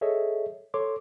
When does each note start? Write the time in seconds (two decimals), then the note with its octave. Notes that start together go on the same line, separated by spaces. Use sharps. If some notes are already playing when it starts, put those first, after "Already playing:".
0.01 G#4 A4 C#5 D#5 E5
0.74 A4 C#5 C6 D6